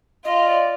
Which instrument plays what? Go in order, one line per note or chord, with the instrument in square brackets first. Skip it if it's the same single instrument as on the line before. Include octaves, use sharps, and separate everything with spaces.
[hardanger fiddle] F4 [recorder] D#5
[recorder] D5